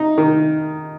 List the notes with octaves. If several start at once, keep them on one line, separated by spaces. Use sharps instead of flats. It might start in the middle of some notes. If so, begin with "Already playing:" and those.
Already playing: D#4
D#3